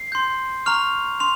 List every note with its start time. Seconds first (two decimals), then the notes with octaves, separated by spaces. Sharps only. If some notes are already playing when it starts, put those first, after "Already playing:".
Already playing: C7
0.12 C6 G6
0.66 A#5 C#6 F6 F7
1.20 C6 F7